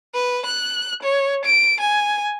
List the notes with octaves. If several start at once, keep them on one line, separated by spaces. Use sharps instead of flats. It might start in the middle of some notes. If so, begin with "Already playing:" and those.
B4
F#6
C#5
D7
G#5